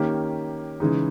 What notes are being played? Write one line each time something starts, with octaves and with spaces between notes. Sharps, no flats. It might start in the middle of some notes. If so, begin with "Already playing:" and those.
Already playing: D#3 A#3 C#4 G4
C#3 E3 G#3 D#4